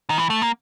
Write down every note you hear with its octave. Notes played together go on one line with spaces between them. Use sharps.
D#3
E3
A3
A#3